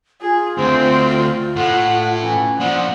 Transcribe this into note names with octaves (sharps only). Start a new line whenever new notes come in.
F4 G#4
D2 C4
A2 F#5
E3 C#4
A#2 F3 D5 F#5